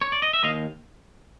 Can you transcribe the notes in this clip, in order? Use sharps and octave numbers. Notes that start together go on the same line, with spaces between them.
C#5
D5
D#5
E5
D#2 D#5 F5